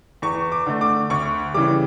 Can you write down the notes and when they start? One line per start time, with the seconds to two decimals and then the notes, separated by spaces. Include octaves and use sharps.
0.22 E2 C#6
0.52 D6
0.66 D3 A3
0.81 D6
1.10 D2 C#6
1.54 C#3 E3 G3 D6